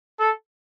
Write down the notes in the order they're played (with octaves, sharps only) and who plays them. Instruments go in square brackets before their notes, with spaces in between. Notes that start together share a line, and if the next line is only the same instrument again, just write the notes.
[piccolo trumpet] A4